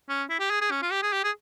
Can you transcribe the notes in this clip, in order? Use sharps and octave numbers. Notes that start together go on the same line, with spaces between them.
C#4
E4
G4
G#4
G#4
C#4
F4
G4
G#4
G4
G#4